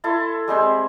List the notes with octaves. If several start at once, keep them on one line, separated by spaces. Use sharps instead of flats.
E4 A4 A5 C6
G3 G#3 C4 C5